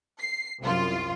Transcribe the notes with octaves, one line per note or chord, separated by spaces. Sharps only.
C7
C2 F#2 F4